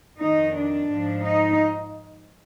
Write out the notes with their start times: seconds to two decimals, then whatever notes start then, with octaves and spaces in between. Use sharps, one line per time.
0.20 F2 D#3 D#4
0.55 D4
0.90 G#2 F3
1.24 D#4